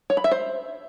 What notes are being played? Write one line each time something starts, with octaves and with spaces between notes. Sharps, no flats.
C#5
B5
E5
C5